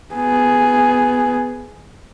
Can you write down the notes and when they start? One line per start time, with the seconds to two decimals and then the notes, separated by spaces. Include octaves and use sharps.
0.14 B3 G#4